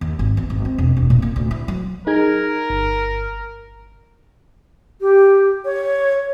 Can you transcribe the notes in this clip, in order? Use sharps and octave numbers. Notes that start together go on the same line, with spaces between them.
D#2
G#1
E2
G#1
C4
E1
E1
A#2
A#3
D2
E4
F#3
D#4 G#4 A#4 G#6
G1
G4
C#5